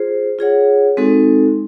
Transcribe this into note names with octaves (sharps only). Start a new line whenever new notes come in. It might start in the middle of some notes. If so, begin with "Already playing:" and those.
Already playing: F4 G#4 C5
F4 G#4 C#5 F#5
G#3 C4 D#4 F#4 A4